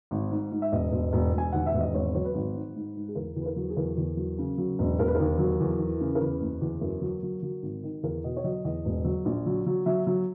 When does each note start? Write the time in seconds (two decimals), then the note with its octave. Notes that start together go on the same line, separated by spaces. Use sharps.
0.11 G#1
0.31 G#2
0.51 G#2
0.62 E5
0.72 E1 D#5
0.92 E1
1.13 E1
1.33 E1 G#5
1.52 D#2 F#5
1.66 E5
1.73 E1
1.80 D#5
1.94 G#1 C#5
2.14 F#3 C#5
2.24 B4
2.34 G#1
2.55 G#2
2.76 G#2
2.96 G#2
3.08 G#4
3.15 E2 A#4
3.36 E2
3.41 B4
3.46 A#4
3.56 F#3
3.69 G#4
3.77 E2 A#4
3.97 E2
4.17 F#3
4.38 C#3
4.58 F#3
4.79 E1
4.99 E1 A#4
5.07 B4
5.15 D#2 A#4
5.39 F#3
5.60 E2
5.79 E3
6.01 C#3
6.15 A#4
6.20 E2 B4
6.41 F#1
6.62 E2
6.81 F#2 A#4
7.02 F#3
7.23 F#3
7.43 F#3
7.62 G#1
7.83 D#3
8.03 E2 A#4
8.24 B2 D#5
8.37 C#5
8.44 F#3 D#5
8.65 E2 D#5
8.85 E1
9.05 F#3
9.25 A#1
9.46 F#3
9.67 F#3
9.86 F#3 E5
10.07 F#3